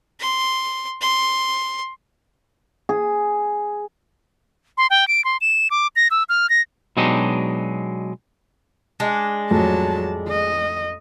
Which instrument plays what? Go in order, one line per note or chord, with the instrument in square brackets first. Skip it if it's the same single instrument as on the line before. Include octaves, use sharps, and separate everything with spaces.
[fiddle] C6
C6
[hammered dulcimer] G#4
[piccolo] C6
G5
D7
C6
E7
D6
A#6
E6
F6
A#6
[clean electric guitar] B2 F#3 G#3 D4 D#4 G4
[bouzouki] G#3 D4
[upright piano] A1 F2 [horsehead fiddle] F#3 A5
[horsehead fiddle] D#5